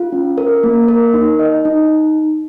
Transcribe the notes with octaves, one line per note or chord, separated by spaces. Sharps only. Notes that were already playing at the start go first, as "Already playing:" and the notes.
Already playing: F4
C#4
A#4
A#3
A#4
D#4
D#5
D#4